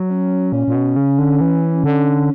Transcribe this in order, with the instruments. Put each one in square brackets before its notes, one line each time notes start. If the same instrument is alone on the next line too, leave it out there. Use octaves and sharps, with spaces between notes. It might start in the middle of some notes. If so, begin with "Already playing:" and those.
Already playing: [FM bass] F#3
[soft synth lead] C#4
[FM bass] A#2 [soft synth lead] C#4
[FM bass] A#2
B2
C#3
D3
E3
D3